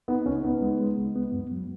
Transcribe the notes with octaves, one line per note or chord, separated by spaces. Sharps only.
B3 D#4
C#2 C#4
B3 D#4
G#3
G#3
C#2
B3
F#2
F#3